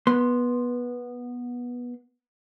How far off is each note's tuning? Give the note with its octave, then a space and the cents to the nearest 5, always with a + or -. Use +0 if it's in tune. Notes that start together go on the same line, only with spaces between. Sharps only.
B3 -15 C6 +0